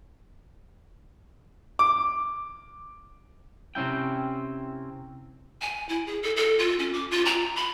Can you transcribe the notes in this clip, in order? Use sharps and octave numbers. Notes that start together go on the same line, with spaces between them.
D6
C3 C4 C#4 E4 G5
G#5
E4
G#4
A4
A4
F4
C#4
D6
F4
A#5
B5